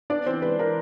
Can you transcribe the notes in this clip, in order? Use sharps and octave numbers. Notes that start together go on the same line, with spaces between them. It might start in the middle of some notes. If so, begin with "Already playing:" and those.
B3 D4 D5
E3 C4 C5
G#3 B4
E3 A#4